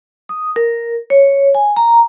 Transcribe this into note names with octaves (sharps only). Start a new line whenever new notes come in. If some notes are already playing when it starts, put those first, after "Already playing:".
D#6
A#4
C#5
G#5
A#5